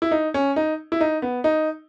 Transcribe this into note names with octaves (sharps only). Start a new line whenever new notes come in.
E4
D#4
C#4
D#4
E4
D#4
B3
D#4